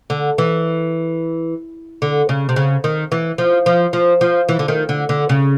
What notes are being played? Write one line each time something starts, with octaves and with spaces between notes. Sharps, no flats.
D3
E3
D3
C#3
C3
C#3
D#3
E3
F3
F3
F3
F3
E3
D3
D#3
D3
D3
C#3